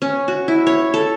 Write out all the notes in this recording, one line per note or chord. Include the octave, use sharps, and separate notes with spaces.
C#4
F#4
E4
C#5
A4